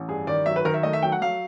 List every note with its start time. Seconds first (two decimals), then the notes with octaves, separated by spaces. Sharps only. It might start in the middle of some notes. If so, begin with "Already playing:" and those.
Already playing: A1
0.08 G2 G#4
0.27 D#3 D5
0.46 F#3 E5
0.56 B4
0.65 D#3 A#4
0.74 E5
0.83 A3 D#5
0.93 E5
1.02 F#3 G5
1.12 F#5
1.21 F#3 F5